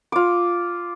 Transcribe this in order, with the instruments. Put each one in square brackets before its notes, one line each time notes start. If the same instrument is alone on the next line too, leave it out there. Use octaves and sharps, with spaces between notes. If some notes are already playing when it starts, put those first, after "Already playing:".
[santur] F4 D6